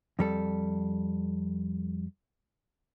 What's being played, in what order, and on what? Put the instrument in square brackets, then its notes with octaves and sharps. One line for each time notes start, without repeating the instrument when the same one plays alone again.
[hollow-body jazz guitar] F2 G3 A4